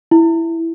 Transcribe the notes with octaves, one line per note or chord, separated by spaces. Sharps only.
E4